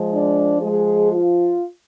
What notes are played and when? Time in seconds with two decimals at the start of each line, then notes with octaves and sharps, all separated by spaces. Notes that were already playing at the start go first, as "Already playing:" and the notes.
Already playing: F3 G#3
0.11 D4 D5
0.61 G#3 G#4
1.11 F4